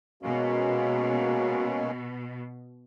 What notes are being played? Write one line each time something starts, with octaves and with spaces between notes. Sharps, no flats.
B2 G#3 A#3 C#4 F#4